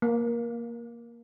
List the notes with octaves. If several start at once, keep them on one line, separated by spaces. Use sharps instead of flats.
A#3